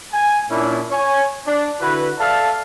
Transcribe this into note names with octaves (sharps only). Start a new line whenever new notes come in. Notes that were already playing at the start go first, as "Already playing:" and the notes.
G#5
A#2 C#4 D4 E4
C#5 G#5
D4
D3 E4 F#4 B4
A4 D5 E5 F5 A5